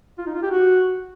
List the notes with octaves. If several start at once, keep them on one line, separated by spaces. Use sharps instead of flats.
F4
D#4
F4
G4
F#4